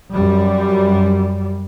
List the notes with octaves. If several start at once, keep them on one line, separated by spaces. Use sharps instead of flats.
F#2 G3